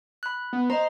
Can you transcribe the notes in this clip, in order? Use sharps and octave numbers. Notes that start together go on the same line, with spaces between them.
B5 F#6
B3
C5 D#5 A#5